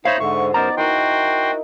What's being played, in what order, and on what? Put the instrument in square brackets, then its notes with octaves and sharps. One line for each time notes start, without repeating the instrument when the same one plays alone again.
[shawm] D#4 [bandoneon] C5 C#5 B5 [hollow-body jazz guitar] E5 F5
[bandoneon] G#2 D3 [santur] C5 [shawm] C#6
[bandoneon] F#2 A#4 C5 [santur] B3 D#4 [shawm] D5 [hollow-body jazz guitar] A#5
[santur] D#4 E4 A#4 [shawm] F#4 [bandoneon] G5 C6